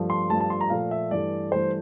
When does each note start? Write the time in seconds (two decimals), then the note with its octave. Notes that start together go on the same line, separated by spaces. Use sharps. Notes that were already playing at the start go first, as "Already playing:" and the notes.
Already playing: G2 F3 A3
0.10 C6
0.30 G2 F3 A3 A5
0.40 A5
0.50 C6
0.61 A#5
0.70 A#2 F3 A3 F5
0.91 E5
1.11 G2 E3 A3 D5
1.51 G2 E3 A3 C5